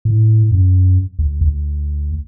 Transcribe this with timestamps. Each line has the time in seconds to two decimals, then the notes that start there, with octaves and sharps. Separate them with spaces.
0.05 A2
0.51 F#2
1.19 D2
1.41 D2